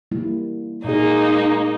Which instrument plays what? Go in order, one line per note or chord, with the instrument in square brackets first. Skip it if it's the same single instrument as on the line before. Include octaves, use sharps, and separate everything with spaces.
[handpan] G3 A#3 E4
[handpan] A#2 G#4 [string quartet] G#3 A#3 D#4